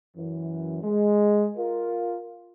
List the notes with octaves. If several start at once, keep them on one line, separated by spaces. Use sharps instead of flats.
F#2 E3
G#3
F4 A#4